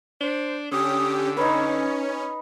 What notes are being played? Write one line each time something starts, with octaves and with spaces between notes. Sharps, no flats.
D4 C5
D3 C#4 G4 D#6
C#4 D#4 B4 C#5